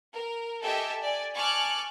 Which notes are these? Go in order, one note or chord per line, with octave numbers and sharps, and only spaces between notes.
A#4
G4 A4 D#5 E5 G5 G#5
D5 G#5
G#5 A5 C#6 D6 F6 F#6